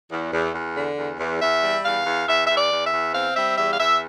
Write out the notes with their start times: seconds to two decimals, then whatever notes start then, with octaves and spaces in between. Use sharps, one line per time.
0.11 E2
0.32 E2
0.54 E2
0.76 D3
0.98 E2
1.19 E2
1.40 E2 E5
1.63 G3
1.84 E2 F5
2.06 E2
2.27 E2 E5
2.47 E2 E5
2.57 D5
2.72 E2
2.86 E5
2.93 E2
3.14 C4 F5
3.36 G3 E5
3.57 E2 E5
3.72 F5
3.79 E2 E5